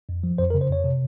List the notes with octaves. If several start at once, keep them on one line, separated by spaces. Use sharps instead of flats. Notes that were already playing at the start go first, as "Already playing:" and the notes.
F2
F3
F2 C5
A#4
C#3
C5
F2 C#5
C3